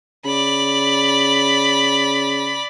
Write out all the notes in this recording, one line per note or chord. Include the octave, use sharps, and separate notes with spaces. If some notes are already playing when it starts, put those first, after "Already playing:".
C#3 D5 B5